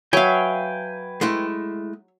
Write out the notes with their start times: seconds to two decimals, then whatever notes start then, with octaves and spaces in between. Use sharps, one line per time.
0.13 F#3 B4 C#5 E5 F5 G5 G#5
1.21 G#3 A3 E4